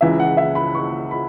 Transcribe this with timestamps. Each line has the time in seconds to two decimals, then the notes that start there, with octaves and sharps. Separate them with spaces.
0.01 C#2 C#3 E3 E5
0.20 F#5
0.37 E5
0.55 B5
0.75 C#6
1.11 B5